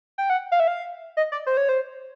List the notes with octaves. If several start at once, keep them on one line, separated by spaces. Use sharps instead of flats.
G5
F#5
F5
E5
F5
D#5
D5
C5
C#5
C5